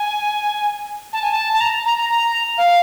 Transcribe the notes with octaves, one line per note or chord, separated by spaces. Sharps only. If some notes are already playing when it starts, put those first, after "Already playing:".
Already playing: G#5
A5
G#5
A5
A5
A#5
A#5
A#5
A#5
F5